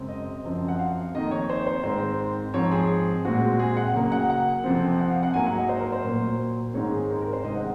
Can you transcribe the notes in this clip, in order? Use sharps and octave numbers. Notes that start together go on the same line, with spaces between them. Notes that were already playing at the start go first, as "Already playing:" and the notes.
Already playing: F#2 C#3 G#3 C4
D#5
F#2 F3 C4
F#5
F5
F2 D#3 A#3 D#5
C#5
C5
C5
G#2 D#3 G#3 C4 C5
G#2 F3 C4 C#5
G#4
A#2 G#3 C4 F#4
G#4
F#5
C#3 F#3 A#3
F#5
F#5
F2 C3 F3 C4
F#5
F5
F#5
G#2 F#3 A#3 G#5
F#5
D#5
C5
A#4
C5
A#2 F#3 A#3
G#2 D#3 G#3 C4 C#5
G#4
A#4
A#4
C5
C3 D#3 G#3 C4 D#5
F#5